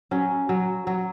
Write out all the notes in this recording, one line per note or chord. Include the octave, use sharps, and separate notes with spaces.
F#3 C#4
F#3
F#3